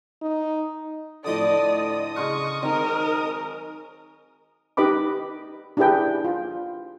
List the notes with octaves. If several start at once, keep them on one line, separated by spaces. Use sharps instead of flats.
D#4
A2 D3 F3 C4 A4 D5 D#5 D#6
C#3 C6 C#6 F6
D#3 F#3 G#3 C4 D#4 A#4
D#4 G4 B4 D#5 B5 D6
D4 E4 G4 G#4 B4 G5
F4